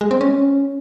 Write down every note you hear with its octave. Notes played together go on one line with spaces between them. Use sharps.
G#3
C4
C#4